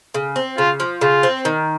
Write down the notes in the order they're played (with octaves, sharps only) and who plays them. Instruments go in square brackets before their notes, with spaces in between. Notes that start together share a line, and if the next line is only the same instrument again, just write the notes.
[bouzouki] C#3
C4
[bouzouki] C#3 [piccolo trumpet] F4
[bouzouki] F3
[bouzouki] C#3 [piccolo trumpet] F4
[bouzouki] C4
D#3